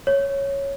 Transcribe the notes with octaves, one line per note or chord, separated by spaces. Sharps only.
C#5